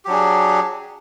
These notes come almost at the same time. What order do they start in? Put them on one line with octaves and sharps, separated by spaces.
G4 F#3 D4 G#4